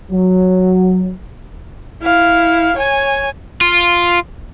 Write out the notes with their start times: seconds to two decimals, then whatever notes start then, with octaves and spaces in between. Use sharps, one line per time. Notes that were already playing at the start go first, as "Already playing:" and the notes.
0.12 F#3
2.02 E4 F5
2.76 C#5 G#5
3.61 F4